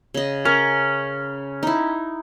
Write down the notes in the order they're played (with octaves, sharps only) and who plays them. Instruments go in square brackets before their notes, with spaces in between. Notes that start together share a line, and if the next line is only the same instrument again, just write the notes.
[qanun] C#3 D#5
[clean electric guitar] C#4 [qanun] A#4
[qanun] D#4 E4